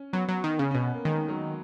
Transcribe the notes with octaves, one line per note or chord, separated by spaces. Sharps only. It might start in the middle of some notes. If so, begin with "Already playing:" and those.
Already playing: C#4
F#3 B3
F#3
D#3
C#3 C#4
B2 C#4
B3
A#3
D#3 G#3
F#3